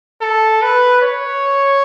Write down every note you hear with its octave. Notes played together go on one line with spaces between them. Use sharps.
A4
B4
C#5